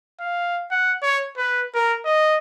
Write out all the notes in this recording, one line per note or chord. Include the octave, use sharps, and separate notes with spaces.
F5
F#5
C#5
B4
A#4
D#5